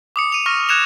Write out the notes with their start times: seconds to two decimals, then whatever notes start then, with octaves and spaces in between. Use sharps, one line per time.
0.16 D6 D#6 C#7
0.32 D#7 F7
0.46 C#6 F6 A#6
0.69 F#6 G#6 C#7 E7 F7